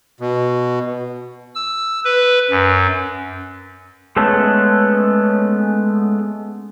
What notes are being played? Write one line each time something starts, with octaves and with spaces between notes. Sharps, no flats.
B2
E6
B4
F#2
G#3 A3 B3 C#4 A4